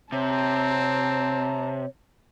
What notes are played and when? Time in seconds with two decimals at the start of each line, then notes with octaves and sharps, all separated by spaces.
0.12 C3 C4 C#5 A5 A#5